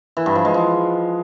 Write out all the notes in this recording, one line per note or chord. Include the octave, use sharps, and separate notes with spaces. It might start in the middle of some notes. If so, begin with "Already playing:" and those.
E3
G2
F3
G#3
F3